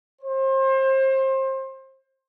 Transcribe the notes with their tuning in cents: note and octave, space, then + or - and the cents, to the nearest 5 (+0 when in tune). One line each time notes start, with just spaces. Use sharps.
C5 +30